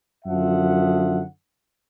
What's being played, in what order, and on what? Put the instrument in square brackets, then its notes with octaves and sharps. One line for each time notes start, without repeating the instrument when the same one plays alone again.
[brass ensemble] F#2 D3 F3 E5 F#5